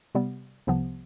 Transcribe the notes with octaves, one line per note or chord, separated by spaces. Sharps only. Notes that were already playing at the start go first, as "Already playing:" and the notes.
C3 G3 B3
C2 C3 F3 B3